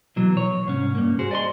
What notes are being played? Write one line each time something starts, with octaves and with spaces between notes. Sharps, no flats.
B2 E3 F#3
C#5
C2 G#2 C#4
G2 A#3
F#4 G#4 C5
D5 D#5 G#5 C6